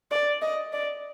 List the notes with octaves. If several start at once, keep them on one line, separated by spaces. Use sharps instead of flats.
D5
D#5
D5